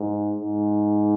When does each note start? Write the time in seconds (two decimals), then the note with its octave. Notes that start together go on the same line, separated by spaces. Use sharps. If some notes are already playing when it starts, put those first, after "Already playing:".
Already playing: G#2
0.39 G#2